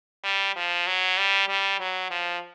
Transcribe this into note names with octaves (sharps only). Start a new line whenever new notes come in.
G3
F3
F#3
G3
G3
F#3
F3